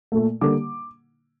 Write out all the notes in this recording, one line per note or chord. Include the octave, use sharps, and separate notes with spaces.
A#2 A3
D3 G3 A#3 D6